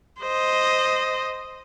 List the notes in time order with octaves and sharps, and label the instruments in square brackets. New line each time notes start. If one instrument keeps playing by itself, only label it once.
[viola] C5 D#5